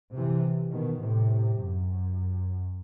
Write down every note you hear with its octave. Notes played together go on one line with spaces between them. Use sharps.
C3 E3
B2 D#3
A2 C3
F#2